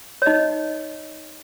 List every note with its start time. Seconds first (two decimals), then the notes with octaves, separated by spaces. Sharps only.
0.22 C#5
0.26 D#4 D#5